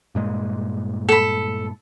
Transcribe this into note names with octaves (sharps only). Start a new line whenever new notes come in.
G2 A#2 G#3
A4 B5